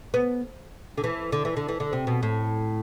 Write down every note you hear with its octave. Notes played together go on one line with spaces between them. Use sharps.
B3
D3
E3
D3
E3
D3
E3
D3
C3
B2
A2